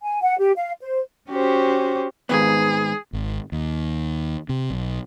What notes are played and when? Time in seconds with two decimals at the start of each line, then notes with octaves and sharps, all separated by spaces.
0.02 G#5
0.22 F#5
0.39 G4
0.57 F5
0.81 C5
1.31 C#4 F#4 G4 C5
2.29 G#2 D#3 B3 G#4
3.13 G#1
3.52 D#2
4.49 C3
4.70 B1